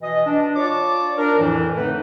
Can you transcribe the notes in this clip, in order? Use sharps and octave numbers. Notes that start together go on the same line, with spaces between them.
B2 E3 D#5
D4
F4 C#5 D5 A5 D6
D4 A#4
F2 A2 E3
D3 A3 C4 D#4 B4